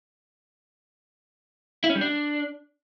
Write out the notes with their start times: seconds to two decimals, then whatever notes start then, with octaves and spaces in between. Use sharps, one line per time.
1.84 E4
1.90 C#4
1.95 G3
2.01 D4